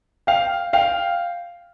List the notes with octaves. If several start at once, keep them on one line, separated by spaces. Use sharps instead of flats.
F5 G5
F5 G5